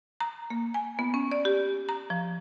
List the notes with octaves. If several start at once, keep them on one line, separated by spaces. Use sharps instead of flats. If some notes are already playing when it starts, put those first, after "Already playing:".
A#5
A#3
G#5
B3
C#4
D5
G4
A#5
F3